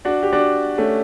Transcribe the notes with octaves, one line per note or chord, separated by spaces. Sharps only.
D4 F#4
G4
D4 F#4
A3 C#4